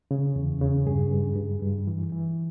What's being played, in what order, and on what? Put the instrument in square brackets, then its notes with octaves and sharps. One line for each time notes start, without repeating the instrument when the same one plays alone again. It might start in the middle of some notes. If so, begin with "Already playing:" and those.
[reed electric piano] C#3
E2
C#3
G2 G#4
G2
G2
G2
E3
E3